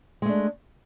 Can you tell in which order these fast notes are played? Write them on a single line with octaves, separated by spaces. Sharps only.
G#3 A3 D4